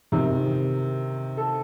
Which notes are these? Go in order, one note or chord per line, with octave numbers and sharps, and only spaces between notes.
C3 D#3
A4